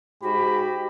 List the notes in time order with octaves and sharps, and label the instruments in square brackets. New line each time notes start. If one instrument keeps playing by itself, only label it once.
[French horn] G#2 [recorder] F#4 [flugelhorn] G4 [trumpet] B5